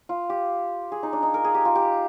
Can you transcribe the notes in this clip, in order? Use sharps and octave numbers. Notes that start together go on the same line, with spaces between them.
F4
G4
G#4
D#4
D4
D#4
A#4
G#4
G4
F4
G4